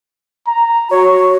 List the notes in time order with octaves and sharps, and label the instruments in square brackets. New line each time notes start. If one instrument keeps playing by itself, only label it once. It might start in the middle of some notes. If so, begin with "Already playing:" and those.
[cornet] A#5
[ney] F#4 [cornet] C#5